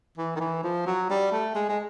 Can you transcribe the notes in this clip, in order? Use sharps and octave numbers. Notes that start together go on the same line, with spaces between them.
E3
D#3
E3
F3
F#3
G3
A3
G#3
G#3